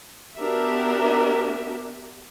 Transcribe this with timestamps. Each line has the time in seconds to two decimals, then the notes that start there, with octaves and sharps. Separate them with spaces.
0.38 B3 D4 F#4 G4 A#4 E5